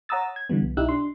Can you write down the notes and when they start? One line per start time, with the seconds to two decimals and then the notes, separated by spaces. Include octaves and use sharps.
0.09 C#5 F#5 A#5 D#6 E6 A6
0.36 G#6
0.50 D3 E3 G3 B3
0.62 C2
0.77 B1 D#4 E4 G4 E6 F#6
0.89 D4 C6